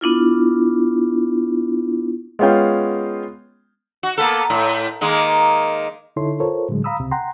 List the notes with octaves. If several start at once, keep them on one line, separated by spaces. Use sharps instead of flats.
B3 D4 E4 F4
G#3 B3 C#4 F4 G5
F#4
A#3 B3 A4
A2
D#3 G#3 A#3
D3 D#4 E4 A4 C#5 C6
F4 A4 A#4 C5 C#5
A2 D3 F#3 G#3
F5 A#5 B5 D#6 E6
C#2 C3
F#5 G5 A#5 C6